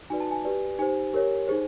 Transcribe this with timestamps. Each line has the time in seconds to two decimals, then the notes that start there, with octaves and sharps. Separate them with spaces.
0.10 D#4 F#4 B4 D5 G#5
0.20 A5
0.31 G#5
0.45 G4 B4 D5
0.78 D#4 G4 C5 G#5
1.13 G4 A#4 C#5
1.48 D#4 G#4 C5